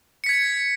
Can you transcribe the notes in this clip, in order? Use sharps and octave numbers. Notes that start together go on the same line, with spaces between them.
G#6 B6 C#7